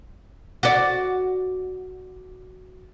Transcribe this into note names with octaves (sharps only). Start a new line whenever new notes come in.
F#4 D5